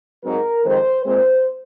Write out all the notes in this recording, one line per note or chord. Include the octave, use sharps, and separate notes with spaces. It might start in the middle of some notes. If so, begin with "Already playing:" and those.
G#2 F#3 C4 A#4
F2 D#3 G#3 C5
A#2 G#3 C4 C5